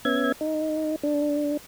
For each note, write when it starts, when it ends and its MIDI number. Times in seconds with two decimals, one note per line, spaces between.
0.05 0.32 59
0.05 0.32 61
0.05 0.32 76
0.05 0.32 92
0.41 0.96 63
1.03 1.57 62